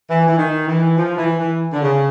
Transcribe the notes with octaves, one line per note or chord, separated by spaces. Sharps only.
E3
E3
D#3
E3
F3
E3
E3
D3
C#3